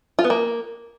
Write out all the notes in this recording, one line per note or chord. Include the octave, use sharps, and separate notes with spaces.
F4
B3
A#3